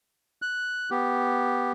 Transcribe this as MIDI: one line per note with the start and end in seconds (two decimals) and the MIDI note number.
0.42 0.90 90
0.91 1.72 59
0.91 1.72 67